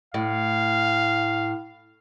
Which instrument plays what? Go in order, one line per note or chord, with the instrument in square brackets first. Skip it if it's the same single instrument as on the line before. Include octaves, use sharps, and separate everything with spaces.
[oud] A2 [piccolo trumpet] F5